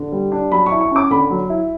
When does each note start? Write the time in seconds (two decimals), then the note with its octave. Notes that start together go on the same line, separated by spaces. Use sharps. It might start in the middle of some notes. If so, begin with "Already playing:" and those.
Already playing: D3
0.12 G3
0.32 D4
0.51 F#3 B5
0.66 C#6
0.72 E4
0.81 C#6
0.91 C#4 D6
1.11 D3 B5
1.30 F#3
1.50 E4